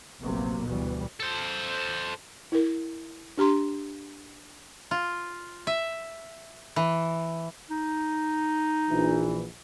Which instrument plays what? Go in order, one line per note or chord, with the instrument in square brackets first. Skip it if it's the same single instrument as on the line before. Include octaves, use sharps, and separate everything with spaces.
[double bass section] F1 A#1 C3 F#3 A#3 B3
D2 B2 E3 G3 B3
[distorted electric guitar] A4 C5
[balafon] E4 A#4
D4 G4 A#5 C6
[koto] F4
E5
E3
[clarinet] D#4
[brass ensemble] A#1 E3